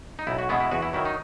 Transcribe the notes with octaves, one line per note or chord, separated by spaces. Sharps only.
D#4
B1 E4
F#4
B2 G#3 B3 E4
E4
E2 F#4
E4
D#3 F#3 E4
D#4